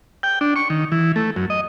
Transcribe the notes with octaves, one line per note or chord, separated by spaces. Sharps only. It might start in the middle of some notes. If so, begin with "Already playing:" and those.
G5
D4
C#6
D#3
E3
A3
F#2
D#5